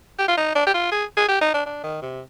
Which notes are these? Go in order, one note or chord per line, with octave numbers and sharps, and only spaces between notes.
G4
F4
D#4
D4
G4
F4
G#4
G#4
G4
D#4
D4
D4
D#3
C3